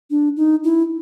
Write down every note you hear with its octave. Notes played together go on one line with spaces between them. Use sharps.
D4
D#4
E4